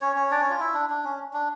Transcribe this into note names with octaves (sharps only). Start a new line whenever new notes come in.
C#4 C#5
C#4 C#5
D4 D5
C#4 C#5
F4
E4
D4
D4
C#4
D4